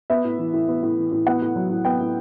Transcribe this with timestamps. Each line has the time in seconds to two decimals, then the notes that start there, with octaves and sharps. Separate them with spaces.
0.10 B3 E5
0.24 A2
0.39 E3
0.53 A2
0.68 B3
0.83 A2
0.98 E3
1.12 A2
1.26 B3 F#5
1.42 A2
1.56 F#3
1.70 A2
1.85 B3 G5
2.00 A2